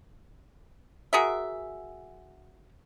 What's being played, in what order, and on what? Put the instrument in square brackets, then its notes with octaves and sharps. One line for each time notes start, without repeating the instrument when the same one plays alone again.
[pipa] F#4 G#4 A#4 E5